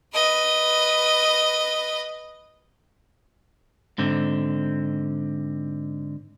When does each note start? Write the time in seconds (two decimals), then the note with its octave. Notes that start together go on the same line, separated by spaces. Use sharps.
0.14 B4 D#5
3.98 G#2 D3 C4